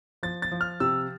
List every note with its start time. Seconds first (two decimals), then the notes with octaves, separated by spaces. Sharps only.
0.23 F3 A6
0.42 A6
0.52 F3
0.61 F6
0.80 C3 E6